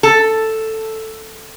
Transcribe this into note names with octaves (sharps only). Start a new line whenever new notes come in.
A4